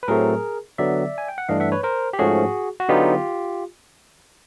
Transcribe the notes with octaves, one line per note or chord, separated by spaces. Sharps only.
B4
A2 F#3 A3 C4 G#4 A#4
D3 F#3 B3 D5 E5
G#5
G5
F#5
G2 E3 A3 D4 D#5 F5
E5 F#5
B4 C#5
A#4 C5
G4
G#2 F3 A3 C#4 F#4 G#4
F#4
D3 F#3 B3 D#4 F4 G4